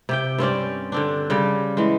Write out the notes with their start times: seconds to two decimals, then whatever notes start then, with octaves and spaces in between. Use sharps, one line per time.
0.09 C3 G4 G5
0.38 G2 C4 C#4 D5
0.92 D3 C4 D4
1.30 C#3 G3
1.77 E3 G#3